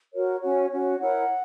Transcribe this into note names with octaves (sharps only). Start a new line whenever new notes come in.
F#4 A#4 C#5
C#4 F#4 C#5
C#4 F#4 C#5
E4 A#4 C#5 F#5